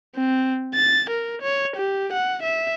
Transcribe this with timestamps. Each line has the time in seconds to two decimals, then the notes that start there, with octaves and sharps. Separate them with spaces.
0.16 C4
0.74 A6
1.10 A#4
1.42 C#5
1.76 G4
2.13 F#5
2.43 E5